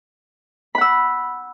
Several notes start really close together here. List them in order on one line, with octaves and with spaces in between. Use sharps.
B5 F#5 E6